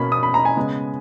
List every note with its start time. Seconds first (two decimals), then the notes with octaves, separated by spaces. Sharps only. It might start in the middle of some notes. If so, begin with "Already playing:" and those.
Already playing: B2 A#3 C#4 B5
0.12 D#6
0.23 B5
0.34 A#5
0.45 G#5
0.57 C#3 G#3 B3